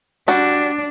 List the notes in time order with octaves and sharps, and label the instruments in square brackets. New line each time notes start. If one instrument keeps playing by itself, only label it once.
[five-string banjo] G3 F#4 [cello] D4